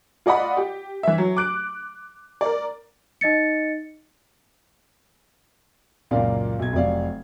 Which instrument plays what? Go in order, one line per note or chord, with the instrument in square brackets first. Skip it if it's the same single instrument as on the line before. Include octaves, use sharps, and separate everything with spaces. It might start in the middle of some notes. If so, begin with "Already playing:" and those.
[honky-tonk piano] F4 D5 D#5 F#5 B5
G4
E3 E5
F#3
D6 F#6 D7
A#4 D5
[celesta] D#4 D#5 A6 C#7
[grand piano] C#2 F#2 A#2 A#3 F4 D5
B1 G#6
F1 F#3 D5 F5